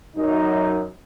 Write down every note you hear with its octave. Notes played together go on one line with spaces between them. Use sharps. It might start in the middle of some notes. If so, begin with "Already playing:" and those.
F#2 D#4